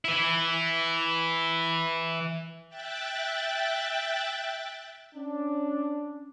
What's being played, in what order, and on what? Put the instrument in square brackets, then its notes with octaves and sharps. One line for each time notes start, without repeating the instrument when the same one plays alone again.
[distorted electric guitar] E3 E4
[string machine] E5 G5 F#6 A6
[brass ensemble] C#4 D4